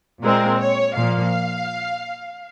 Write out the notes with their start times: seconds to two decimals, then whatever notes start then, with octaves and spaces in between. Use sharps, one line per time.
0.23 A#2 G#3 C4 A#4
0.60 C#5
0.96 A#2 F3 A#3 F5